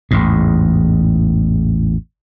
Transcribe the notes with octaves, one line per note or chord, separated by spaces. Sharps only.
A1 E2 G#2